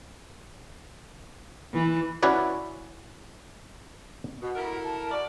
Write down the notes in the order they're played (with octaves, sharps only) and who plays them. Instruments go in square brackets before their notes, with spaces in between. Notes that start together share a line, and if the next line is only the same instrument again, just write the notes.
[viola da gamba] E3
[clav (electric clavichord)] C#4 E4 F#4 B4 C#5 D5
[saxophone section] B2 [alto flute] F#4
[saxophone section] E4 A4 A#4
[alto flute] A5
[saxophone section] F#4 D5